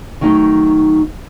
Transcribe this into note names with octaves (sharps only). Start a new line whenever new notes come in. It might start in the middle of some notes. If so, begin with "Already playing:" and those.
D#3 F#3 A3 D#4